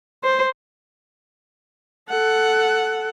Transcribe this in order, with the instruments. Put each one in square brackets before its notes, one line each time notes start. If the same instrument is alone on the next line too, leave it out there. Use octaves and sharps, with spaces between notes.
[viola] C5
A4 F#5